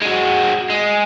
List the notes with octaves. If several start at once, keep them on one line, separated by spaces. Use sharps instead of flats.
G#3 F#4
G#3